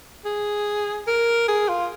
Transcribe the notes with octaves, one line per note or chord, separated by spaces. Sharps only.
G#4
A#4
G#4
F4